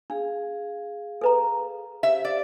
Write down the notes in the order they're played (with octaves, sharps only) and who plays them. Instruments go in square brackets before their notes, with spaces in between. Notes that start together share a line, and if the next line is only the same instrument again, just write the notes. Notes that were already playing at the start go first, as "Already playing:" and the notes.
[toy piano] D4 [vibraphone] G#4 F5
[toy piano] A4 B4 A#5
[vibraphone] G4 C5 F5 [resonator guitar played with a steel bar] E5
[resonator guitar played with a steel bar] D5